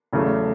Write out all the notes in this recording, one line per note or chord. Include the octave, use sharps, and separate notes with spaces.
E2 C#3 F#3 A3